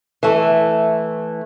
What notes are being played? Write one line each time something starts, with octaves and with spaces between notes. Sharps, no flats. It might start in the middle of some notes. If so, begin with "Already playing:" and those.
E3 A3